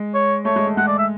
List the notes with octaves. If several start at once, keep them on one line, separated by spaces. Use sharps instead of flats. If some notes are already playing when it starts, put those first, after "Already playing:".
Already playing: G#3
C#5
A3 C#5
G#3
A3
G#3 F#5
D5
E5